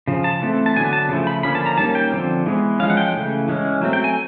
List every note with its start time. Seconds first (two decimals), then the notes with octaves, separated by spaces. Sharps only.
0.07 C#3 F3
0.24 A5
0.42 E3 A3 C4
0.66 A5
0.76 D3 F#3 B3 G#5
0.93 A5
1.09 C#3 F3 A3
1.27 B5
1.43 D3 F3 A#3 C#4 B5
1.55 A5
1.66 A#5
1.77 D#3 G3 A#3 C#4 A5
1.95 G5
2.12 D3 F3 G#3 C4
2.46 E3 G#3 B3
2.79 F3 G#3 C#4 F5
2.90 F#5
2.97 G5
3.13 C#3 E3 A3
3.48 E3 G#3 C#4
3.81 F#3 A3 C4
3.93 G5
4.04 G#5